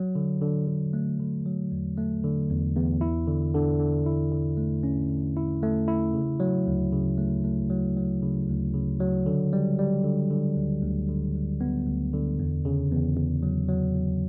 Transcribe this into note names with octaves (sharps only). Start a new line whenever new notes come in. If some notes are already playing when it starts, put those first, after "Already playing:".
Already playing: F#3
D3
D3
D3
A3
D3
F#3
E2
A3
D3
E2
E2
E4
D3
D3
D3
E4
D3
A3
C#4
D3
E4
A3
E4
C#3
F#3
D2
C#3
A3
A3
F#3
F#3
C#3
D2
C#3
F#3
D3
G3
G3
D3
D3
D2
D2
D3
D2
B3
D2
D3
E2
C#3
E2
E2
F#3
F#3
E2